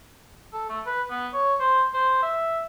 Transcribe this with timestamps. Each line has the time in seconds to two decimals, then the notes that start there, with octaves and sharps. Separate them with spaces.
0.53 A4
0.69 A3
0.86 B4
1.10 B3
1.33 C#5
1.60 C5
1.94 C5
2.22 E5